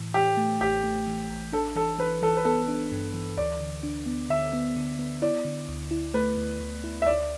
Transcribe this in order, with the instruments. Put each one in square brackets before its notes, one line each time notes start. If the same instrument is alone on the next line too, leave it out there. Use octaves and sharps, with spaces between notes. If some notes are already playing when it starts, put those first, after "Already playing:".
Already playing: [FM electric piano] A2 E3
[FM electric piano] E3 [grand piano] G4
[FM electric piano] A3
[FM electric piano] A1 [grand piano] G4
[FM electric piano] A3
E3
A1
[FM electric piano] D4 [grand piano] A4
[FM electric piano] E3 [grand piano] A4
[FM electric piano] E3 [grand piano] B4
[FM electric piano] E3 [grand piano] A4
[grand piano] B4
[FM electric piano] B3 [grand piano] A4
[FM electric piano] D4
G2
E3
[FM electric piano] D2 [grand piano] D5
[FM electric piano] D3
D4
B3
[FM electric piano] D3 [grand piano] E5
[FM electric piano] B3
D3
B3
[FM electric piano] E4 [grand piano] D5
[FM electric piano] D3
D2
E4
[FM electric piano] A3 [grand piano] B4
[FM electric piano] D2
D2
E4
[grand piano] E5
[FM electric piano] D2 [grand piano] D5